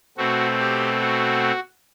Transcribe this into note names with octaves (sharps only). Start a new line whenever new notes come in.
B2 A3 C4 F#4
G4
F#4